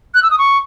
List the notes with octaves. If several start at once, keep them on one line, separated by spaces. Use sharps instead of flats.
F#6
E6
D#6
C#6